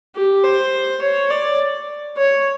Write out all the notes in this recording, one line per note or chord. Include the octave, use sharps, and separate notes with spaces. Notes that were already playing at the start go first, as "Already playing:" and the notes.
G4
C5
C#5
D5
C#5